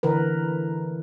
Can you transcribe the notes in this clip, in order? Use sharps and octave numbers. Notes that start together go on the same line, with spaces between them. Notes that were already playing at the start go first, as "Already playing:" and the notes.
D3 E3 A#4 B4